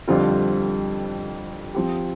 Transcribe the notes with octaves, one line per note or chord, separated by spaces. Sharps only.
F2 D3 G3 C4 F4
F3 C4 G4